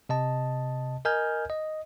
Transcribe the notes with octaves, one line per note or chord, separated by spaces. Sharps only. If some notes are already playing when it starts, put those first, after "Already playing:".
C3 D#5 A5
A#4 D#5 G#5 F6 G6 G#6
D#5